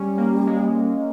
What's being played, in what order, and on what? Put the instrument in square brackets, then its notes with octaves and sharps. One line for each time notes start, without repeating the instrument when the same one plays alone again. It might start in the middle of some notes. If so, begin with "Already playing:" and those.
Already playing: [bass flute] G3 [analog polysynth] C#4
[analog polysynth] A#3
G#3